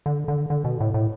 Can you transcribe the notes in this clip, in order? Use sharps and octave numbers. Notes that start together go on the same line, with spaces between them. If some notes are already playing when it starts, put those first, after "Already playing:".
D3
D3
D3
B2
A2
A2